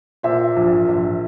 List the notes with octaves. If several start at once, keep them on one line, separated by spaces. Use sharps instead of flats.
A#2 C5 E5
A#1
A#1